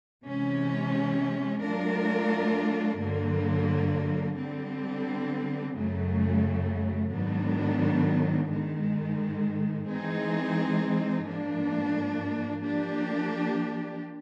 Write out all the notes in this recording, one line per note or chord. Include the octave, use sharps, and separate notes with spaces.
C3 E3 G#3 C#4
F#3 A3 D4 F4 A#4
G2 D3 F#3 A#3
D3 G3 C4
F#2 C#3 F#3 A3
G#2 D#3 F#3 B3 D4
G#2 D#3 G#3
E3 G#3 C4 D#4 G#4
G#2 F3 A#3 D4
F3 A#3 D4 G4